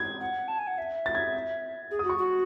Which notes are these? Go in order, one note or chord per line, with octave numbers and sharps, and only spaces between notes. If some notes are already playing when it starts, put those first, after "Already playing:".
Already playing: G#6
F#5
A5
G#5
F#5
E5
A6
G#6
G#4
F#4 D#6
C#6
F#4